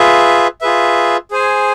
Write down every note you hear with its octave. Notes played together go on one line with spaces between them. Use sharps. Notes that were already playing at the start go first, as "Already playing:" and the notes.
Already playing: F4 G#4 B4 E5
F4 G#4 B4 E5
G#4 C5 G#5